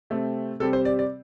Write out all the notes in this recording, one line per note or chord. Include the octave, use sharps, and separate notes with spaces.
C3 A3 C4
C3 G3 C4 A4
C5
D5
D5